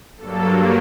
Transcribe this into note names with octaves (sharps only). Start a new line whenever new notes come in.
G2 F#3 A#3 A4